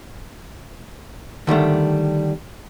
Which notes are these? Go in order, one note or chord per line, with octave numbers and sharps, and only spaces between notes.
D3 D#3 G3 A3